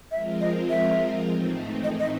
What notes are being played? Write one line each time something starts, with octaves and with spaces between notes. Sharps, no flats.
F3 G#3 C4 F4 A#4 E5
D#5
E5
A2 E3 A3 C4 D#4
D#5
D#5